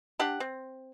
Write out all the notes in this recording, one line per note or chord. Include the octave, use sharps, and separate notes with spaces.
D4 G4 F#5
C4